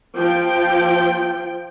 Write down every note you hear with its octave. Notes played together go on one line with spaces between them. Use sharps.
F3 G5